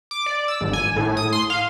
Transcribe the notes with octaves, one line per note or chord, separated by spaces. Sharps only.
D6
D5
E6
G#1
G#5
A2
D#6
C6
F5